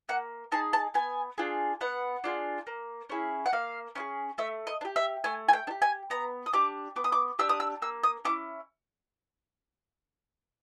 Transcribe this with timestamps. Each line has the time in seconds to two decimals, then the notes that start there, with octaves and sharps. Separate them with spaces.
0.09 A#3 F#5
0.52 D#4 G#4 A5
0.73 A5
0.94 B3 G#5
1.38 D4 F4 G#4
1.81 B3 F#5
2.24 D4 F4 G#4
2.67 A#3
3.10 C#4 E4 G#4
3.46 F#5
3.52 A#3 F5
3.95 C#4 E4
4.00 G#4
4.38 A3 E5
4.67 D#5
4.81 D4
4.85 G4
4.96 E5
5.24 A3 G#5
5.49 G#5
5.53 G5
5.67 D4
5.71 G4
5.82 G#5
6.10 B3 A#5
6.46 D#6
6.53 D4 G4 D6
6.96 B3 D6
7.04 D#6
7.12 D6
7.39 D4 G4 E6
7.49 D#6
7.60 E6
7.82 A#3 E6
8.03 D#6
8.25 C#4 E4 D6